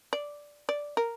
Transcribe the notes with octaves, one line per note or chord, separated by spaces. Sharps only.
D5
D5
A#4